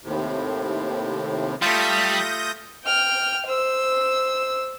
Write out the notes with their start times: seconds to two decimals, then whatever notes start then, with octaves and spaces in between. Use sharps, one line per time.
0.04 D#2 A2 C3
1.62 G3 A3 F4 D#6 G6 A#6
2.84 G5 F6
3.46 C5 E6